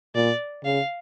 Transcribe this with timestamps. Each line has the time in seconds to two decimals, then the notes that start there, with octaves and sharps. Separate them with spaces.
0.15 A#2 D5
0.64 C#3 F5